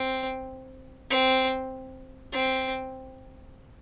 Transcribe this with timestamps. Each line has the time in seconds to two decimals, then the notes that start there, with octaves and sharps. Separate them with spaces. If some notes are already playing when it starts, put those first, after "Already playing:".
Already playing: C4
1.10 C4
2.33 C4